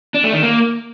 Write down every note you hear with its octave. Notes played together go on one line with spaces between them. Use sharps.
D4
A3
D#3
A#3